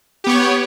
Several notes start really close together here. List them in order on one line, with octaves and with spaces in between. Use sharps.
G4 B3 C#5